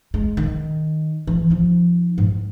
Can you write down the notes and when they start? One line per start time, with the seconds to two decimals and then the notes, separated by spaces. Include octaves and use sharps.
0.14 G#3
0.37 D#3
1.27 E3
1.50 F3 D#4
2.18 G#2